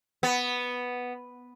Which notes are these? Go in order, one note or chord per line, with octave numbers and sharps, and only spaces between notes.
B3